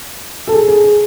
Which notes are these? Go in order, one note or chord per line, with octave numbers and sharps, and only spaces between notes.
A4
G#4
G#4
G#4